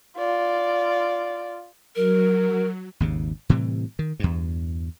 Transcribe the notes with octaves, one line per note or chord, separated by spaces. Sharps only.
F4 D5
F#3 A#4
G#1 D#2 C#3
A2 C3 E3 G3
D#3
E2 G2